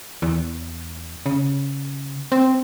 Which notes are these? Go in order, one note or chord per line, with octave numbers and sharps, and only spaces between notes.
E2
C#3
C4